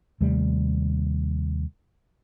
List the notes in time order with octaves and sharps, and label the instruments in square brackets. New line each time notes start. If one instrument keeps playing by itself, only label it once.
[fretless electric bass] D#2 C3 G3 A3